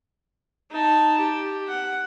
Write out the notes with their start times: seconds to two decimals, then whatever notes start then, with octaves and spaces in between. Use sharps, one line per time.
0.71 D#4 A5
1.18 G4
1.68 F#5